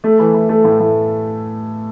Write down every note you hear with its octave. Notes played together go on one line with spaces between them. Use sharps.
A3
E3
E3
A3
A2
A2